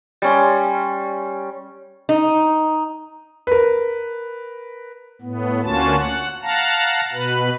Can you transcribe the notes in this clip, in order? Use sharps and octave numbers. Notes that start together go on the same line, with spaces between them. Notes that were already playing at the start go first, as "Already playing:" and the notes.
G3 C#4 C6
D#4
A#4 B4
A2 B3
D2 A#3 C#4 F4 F#4 A5
F#5
F5 F#5 A5 A#5
B2 B4 F#6